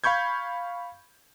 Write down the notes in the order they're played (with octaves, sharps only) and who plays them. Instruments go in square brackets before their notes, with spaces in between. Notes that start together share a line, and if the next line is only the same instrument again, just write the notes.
[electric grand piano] F5 B5 C#6 G6 G#6